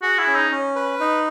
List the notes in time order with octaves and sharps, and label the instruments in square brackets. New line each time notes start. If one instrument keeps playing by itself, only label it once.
[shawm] F#4 [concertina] G#4
[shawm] E4
[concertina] C#4
[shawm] D#4
[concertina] C#4
B4
D#4